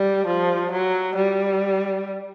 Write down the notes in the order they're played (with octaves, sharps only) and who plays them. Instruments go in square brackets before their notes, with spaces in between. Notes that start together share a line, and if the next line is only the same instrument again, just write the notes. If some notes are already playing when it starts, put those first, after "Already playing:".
Already playing: [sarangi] G3
F3
F#3
G3